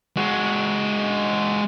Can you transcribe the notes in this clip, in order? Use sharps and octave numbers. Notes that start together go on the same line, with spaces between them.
G#3 F#4